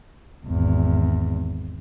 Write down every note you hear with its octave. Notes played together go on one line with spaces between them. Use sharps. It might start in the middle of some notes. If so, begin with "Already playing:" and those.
G#1 E2